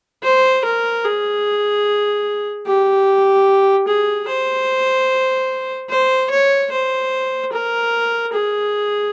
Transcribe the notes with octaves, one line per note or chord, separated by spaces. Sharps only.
C5
A#4
G#4
G4
G#4
C5
C5
C#5
C5
A#4
G#4